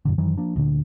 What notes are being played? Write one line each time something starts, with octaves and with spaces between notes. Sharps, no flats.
F#2 A#2 D3
F#2 D#3 E3 F#3
F3 A#3 D4
D2 A#2 D3